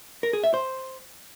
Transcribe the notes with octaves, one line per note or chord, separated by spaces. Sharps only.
A#4
G#4
E5
C5